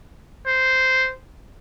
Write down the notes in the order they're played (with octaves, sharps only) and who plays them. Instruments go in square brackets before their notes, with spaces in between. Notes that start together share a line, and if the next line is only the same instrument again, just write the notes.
[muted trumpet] C5